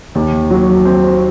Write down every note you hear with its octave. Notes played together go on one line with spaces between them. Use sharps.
D#2
F#3
C4